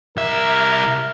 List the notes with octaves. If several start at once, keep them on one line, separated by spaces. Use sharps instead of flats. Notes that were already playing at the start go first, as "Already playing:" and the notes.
C2 A#4 E5